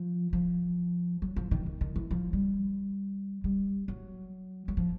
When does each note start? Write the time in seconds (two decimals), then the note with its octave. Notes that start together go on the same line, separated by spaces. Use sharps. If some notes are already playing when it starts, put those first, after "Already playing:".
Already playing: F3
0.33 F3
1.22 F#3
1.36 F3
1.51 D#3
1.66 D#3
1.81 D#3
1.96 E3
2.11 F3
2.33 G3
3.44 G3
3.88 F#3
4.68 F#3
4.77 F3